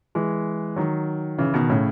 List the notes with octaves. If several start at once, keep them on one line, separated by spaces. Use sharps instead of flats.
E3 G#3
D#3 F#3
C#3 E3
B2 D#3
A2 C#3